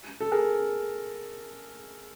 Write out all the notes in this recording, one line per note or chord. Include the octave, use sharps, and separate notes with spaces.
A4
G#4 A#4